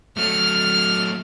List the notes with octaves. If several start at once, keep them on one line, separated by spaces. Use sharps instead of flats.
F#3 A3 F6